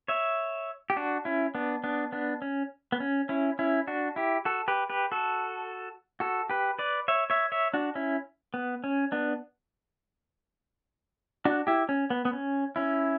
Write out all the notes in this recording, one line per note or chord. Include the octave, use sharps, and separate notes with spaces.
C#5 E5
G4
D4 F#4
C#4 E4
B3 D4
B3 D4
B3 D4
C#4
B3
C#4
C#4 E4
C#4 E4
D4 F#4
E4 G4
F#4 A4
G4 B4
G4 B4
F#4 A4
F#4 A4
G4 B4
B4 D5
C#5 E5
C#5 E5
C#5 E5
D4 F#4
C#4 E4
B3
C#4
B3 D4
D4 F#4
E4 G4
C#4
B3
B3
C#4
C#4 E4